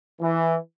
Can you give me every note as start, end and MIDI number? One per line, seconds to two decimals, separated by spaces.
0.21 0.57 52